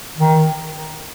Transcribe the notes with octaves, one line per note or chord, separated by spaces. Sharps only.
D#3